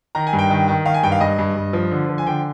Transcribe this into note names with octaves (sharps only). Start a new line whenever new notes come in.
D#3 A#5
G#5
G2
G5
D#3
D#3
D#3 F5
G#5
G2 G5
F5
G2 D#5
G2
G2
F3
D3
F3
G#5
D3 G5